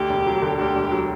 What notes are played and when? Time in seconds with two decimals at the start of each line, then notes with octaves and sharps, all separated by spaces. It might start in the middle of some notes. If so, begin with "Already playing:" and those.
Already playing: D2 G4
0.09 E1
0.26 F#3
0.42 D3
0.58 D2 G4
0.75 E1
0.91 F#3